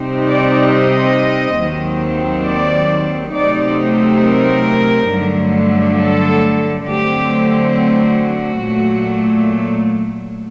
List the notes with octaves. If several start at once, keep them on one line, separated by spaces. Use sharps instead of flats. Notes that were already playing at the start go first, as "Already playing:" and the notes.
Already playing: C3 G3 C4 D#4
D5
D#5
D#2 D#3 F#3 C4
D5
C3 F#3 A3 C4 D#4 D5
A#4
G2 D3 F#3 A3
A4
D3 F#3 A3 C4 G4
F#4
A#2 F#3 A3